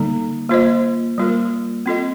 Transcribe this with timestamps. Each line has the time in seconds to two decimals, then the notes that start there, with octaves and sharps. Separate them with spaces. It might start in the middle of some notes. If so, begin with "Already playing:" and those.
Already playing: D3 G3 A#3 D#4
0.49 A#3 F4 C5 D#5
1.18 G3 A#3 F4 A#4
1.86 C4 F4 A4 D#5